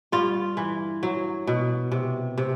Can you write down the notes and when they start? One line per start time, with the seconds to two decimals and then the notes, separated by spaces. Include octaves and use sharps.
0.12 G2 F4
0.57 E3
1.03 F#3
1.47 B2
1.92 C3
2.38 C3